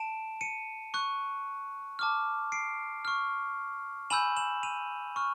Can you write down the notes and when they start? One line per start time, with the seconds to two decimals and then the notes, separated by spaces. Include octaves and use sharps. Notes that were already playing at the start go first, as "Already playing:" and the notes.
Already playing: A5 D7 E7
0.41 C#7 D#7
0.94 C#6 F#6
1.99 A5 D6 F6
2.52 C7 D7
3.05 C#6 F6
4.10 G#5 B5 E6 G6 E7 F#7
4.36 E7 F#7
4.63 D#7 F7
5.16 C#6 F6